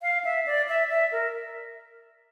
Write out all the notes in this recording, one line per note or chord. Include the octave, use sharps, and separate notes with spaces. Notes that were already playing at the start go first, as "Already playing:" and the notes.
F5
E5
D5
E5
E5
A#4